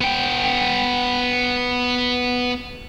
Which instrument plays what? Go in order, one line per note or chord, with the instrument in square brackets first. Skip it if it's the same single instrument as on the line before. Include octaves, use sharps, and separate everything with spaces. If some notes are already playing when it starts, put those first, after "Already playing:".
[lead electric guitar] B3 G5